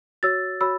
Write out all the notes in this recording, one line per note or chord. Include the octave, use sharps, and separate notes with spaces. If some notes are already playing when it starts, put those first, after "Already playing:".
F#4 C#5 E6 A6
F#4 C#5 B5 E6